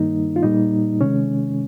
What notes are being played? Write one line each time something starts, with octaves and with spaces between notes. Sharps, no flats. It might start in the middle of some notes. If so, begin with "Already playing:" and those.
Already playing: G2 D#3 G3 A#3 D#4
F4
A#2 G3 A#3 D#4
C3 D#3 G#3 C#4